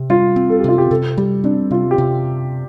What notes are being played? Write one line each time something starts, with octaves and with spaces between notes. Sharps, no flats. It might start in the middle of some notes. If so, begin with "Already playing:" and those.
Already playing: C3
G3 F4
C4
A4
G4
C3 F4
G4
C3 A4
G3 G4
C4 D4
C3 F4
G4
C3